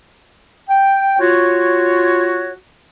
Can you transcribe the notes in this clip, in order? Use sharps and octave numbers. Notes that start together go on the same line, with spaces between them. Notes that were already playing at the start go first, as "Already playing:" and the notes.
G5
F4 F#4 C#5